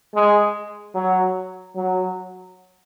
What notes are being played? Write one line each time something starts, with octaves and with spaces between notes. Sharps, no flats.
G#3
F#3
F#3